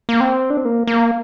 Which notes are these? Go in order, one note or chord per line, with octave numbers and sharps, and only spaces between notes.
A#3
C4
D4
C4
A#3
A#3